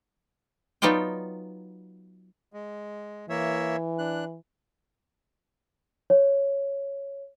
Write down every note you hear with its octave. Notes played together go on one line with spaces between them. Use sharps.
F#3 B3 D#4 F4 D5 G5
G#3
E3 A#3 C#5 E5
D4 F#6
C#5